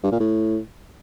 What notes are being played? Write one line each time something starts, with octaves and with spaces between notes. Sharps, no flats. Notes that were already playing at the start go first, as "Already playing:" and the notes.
G2
A#2
A2